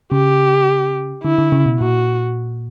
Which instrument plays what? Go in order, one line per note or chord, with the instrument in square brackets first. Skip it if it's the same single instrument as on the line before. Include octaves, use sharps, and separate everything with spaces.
[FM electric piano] C#3 [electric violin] G4
[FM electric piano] D3 [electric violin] E4
[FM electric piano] D3
C#3
B2
[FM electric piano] A#2 [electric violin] F#4